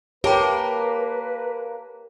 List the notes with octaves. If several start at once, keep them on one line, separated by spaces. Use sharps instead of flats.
A#3 G4 B4 C#5 A5 B5